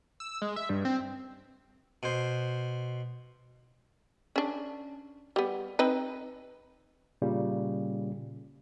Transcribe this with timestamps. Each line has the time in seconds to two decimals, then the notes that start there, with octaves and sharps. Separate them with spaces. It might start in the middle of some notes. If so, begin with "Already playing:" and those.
0.20 E6
0.42 G#3
0.56 E5
0.69 G2
0.85 C4
2.03 B2 C5
4.36 C#4 D4
5.36 G3 B3
5.79 C4 D#4 B4
7.22 A#2 C#3 G3